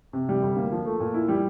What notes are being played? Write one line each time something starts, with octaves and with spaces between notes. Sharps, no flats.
C3
G3
D2
A#3
F3
A3
A#2
E4
G3